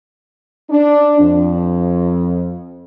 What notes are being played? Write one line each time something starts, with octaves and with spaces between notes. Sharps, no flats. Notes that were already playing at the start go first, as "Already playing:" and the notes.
D4
F2